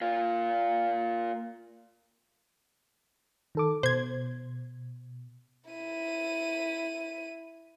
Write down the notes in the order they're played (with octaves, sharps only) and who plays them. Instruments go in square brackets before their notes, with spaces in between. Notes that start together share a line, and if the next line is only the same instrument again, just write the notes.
[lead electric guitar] A#3 F4
[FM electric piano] D#3 A4 D6
[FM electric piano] B2 [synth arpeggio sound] C5 G#6
[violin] E4 D#7